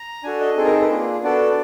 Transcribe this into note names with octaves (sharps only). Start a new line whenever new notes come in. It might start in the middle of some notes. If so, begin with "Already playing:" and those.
Already playing: A#5
D4 F#4 A4 G#5
D#5
C4 D#4 G#4 A4
A#4
A4
B4
A#3 D4 F4 G#4
B3 D4 F#4 A4 D5